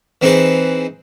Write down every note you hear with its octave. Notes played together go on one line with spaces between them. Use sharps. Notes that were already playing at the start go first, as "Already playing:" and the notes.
E3 C4 D#4 G#4 B4 C5